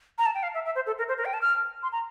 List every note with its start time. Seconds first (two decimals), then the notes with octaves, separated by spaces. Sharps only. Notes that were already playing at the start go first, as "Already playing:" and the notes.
0.18 A#5
0.26 A5
0.35 G5
0.43 F5
0.54 E5
0.66 E5
0.75 C5
0.87 A4
0.98 A#4
1.08 C5
1.18 A#4
1.25 G5
1.34 A5
1.42 F6
1.83 C6
1.92 A#5